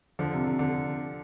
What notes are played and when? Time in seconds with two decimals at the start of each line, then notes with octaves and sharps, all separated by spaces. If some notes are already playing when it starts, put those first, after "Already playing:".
0.19 D3 F3
0.33 C3
0.47 C3
0.59 D3
0.71 C3